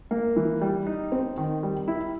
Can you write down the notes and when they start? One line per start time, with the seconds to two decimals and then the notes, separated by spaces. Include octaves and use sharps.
0.11 A#3
0.36 E3
0.61 G3
0.87 D#4
1.12 C4
1.38 D#3
1.63 G3
1.88 E4